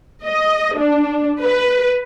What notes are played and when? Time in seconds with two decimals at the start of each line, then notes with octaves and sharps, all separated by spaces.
0.25 D#5
0.76 D4
1.42 B4